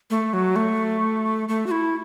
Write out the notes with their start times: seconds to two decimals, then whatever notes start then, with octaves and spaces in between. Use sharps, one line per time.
0.10 A3
0.33 F#3
0.56 A3
1.49 A3
1.67 F#4
1.71 E4